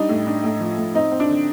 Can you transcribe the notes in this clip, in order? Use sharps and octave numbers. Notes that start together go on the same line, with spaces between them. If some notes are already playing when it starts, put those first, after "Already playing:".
Already playing: G3 D4 D#4
A2
D4
A2
F3
A2
C4 D#4
C4
D4
D3